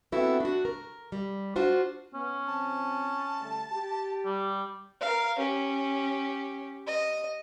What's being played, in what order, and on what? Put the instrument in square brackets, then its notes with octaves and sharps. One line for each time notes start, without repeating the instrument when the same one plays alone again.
[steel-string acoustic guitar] B3 C4 D4 E4 F#4 A4
D4 F#4
A#4
G3
D4 F4 F#4 C5
[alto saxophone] B3 [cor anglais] C#4
[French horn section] F3 C4 [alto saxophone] A5
[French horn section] D3 G3 A3
G4
[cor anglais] G3
[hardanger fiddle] A#4 F5
C#4 G4
D#5